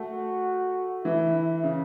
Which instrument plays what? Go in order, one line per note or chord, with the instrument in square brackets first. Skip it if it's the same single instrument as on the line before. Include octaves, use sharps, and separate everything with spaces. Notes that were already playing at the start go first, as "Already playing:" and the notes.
Already playing: [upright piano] A3 [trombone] F#4
[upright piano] E3 [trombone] E4
[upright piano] C#3